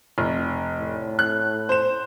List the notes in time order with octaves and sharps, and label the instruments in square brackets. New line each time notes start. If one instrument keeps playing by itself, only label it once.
[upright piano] F1
[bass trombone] A2
[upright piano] F#6
C5 E7